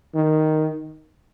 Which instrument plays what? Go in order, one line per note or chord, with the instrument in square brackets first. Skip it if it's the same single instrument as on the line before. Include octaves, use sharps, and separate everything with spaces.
[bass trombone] D#3